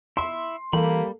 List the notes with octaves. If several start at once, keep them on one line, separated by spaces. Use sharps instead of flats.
E4 E5 C6
E3 G3 A#3 G4 A4 B5